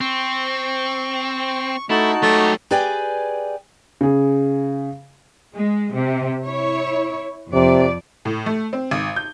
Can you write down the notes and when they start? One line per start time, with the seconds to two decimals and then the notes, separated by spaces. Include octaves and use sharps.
0.01 C4 C#6
1.90 A3 D#4 E4 F#4 A5
2.23 F#3 A3 G4
2.71 G4 G#4 B4 D5 G5 G#5
4.01 C#3 G#4
5.53 G#3
5.93 C3
6.44 E4 C#5
7.53 F2 C3 D5
8.25 A2
8.46 A3
8.73 C4
8.91 G#1
9.16 G6